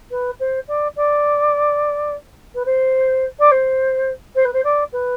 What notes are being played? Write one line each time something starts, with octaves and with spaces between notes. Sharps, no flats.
B4
C5
D5
D5
B4
C5
D5
C5
C5
B4
C5
D5
B4